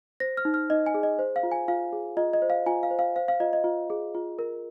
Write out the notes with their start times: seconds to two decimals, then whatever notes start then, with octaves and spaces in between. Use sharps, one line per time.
0.20 C5 A#6
0.37 F6
0.45 D#4
0.54 F6
0.70 D#4 D#5
0.86 G#5
0.94 G#4
1.03 D#5
1.19 C5
1.36 F5
1.43 F4
1.51 G#5
1.68 F4 F5
1.93 G#4
2.17 F4 D#5
2.33 D#5
2.42 C5
2.50 F5
2.66 F4 G#5
2.83 F5
2.91 C5
2.99 F5
3.16 C5 F5
3.28 F5
3.40 F4 D#5
3.53 D#5
3.64 F4
3.90 G#4
4.14 F4
4.39 A#4